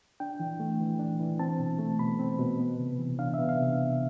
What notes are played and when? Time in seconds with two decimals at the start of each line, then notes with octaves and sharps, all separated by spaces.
0.20 D4 G5
0.40 E3
0.60 A3
0.80 E3
0.99 D4
1.20 E3
1.39 C4 A5
1.60 B2
1.79 A3
1.99 B2 B5
2.19 C4
2.39 B2
2.59 B3
2.79 C3
2.98 E3
3.19 D4 F5
3.34 E5
3.39 B3
3.49 F5
3.58 C3